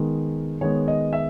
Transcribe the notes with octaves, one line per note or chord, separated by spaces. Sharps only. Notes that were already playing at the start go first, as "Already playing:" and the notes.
Already playing: D#3 G#3 B3
D#3 G#3 B3 C#5
D#5
E5